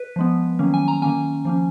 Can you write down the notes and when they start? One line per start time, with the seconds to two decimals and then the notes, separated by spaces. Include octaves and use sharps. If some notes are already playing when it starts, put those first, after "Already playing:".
Already playing: B4
0.16 F3 G#3 B3
0.59 D#3 F#3 A#3 C#4
0.74 G#5
0.88 A#5
1.02 D#3 A#3 C#4 G#5
1.45 F3 A#3 C#4